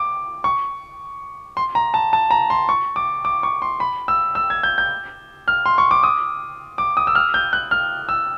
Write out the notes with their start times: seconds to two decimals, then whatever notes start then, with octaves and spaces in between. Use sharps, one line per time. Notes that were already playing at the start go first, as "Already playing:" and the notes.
Already playing: D6
0.44 C#6
1.57 C6
1.75 A#5
1.94 A5
2.13 A5
2.31 A#5
2.50 C6
2.69 C#6
2.96 D6
3.25 D6
3.43 C#6
3.62 C6
3.80 B5
4.08 E6
4.35 E6
4.50 G#6
4.63 G6
4.78 G6
5.48 F6
5.66 C6
5.78 C#6
5.91 D6
6.03 D#6
6.78 D6
6.97 D#6
7.07 E6
7.15 F6
7.34 G6
7.53 F#6
7.71 F6
8.09 E6